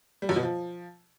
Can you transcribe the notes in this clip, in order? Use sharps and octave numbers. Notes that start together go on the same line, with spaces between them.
G3
F#2
B2
F3